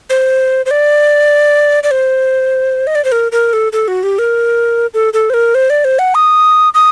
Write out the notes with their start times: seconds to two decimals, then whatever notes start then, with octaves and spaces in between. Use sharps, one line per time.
0.10 C5
0.66 C5
0.71 D5
1.83 D5
1.91 C5
2.87 D#5
2.95 D5
3.05 C5
3.12 A#4
3.32 A#4
3.53 A4
3.73 A4
3.88 F#4
4.03 G4
4.19 A#4
4.94 A4
5.14 A4
5.30 C5
5.34 A#4
5.55 C5
5.70 D5
5.85 C5
5.99 F#5
6.15 D#6
6.74 D#6